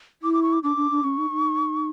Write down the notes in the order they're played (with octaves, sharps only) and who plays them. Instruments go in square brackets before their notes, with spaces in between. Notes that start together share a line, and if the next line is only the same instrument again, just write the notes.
[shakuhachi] E4 [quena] D6
[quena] D6
C#6
D6
[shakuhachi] D4 [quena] D6
[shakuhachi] D4
D4
[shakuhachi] C#4 [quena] C#6
[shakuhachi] D#4
D#4